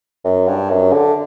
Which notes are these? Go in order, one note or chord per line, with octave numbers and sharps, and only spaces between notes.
F#2
G2
F#2
D3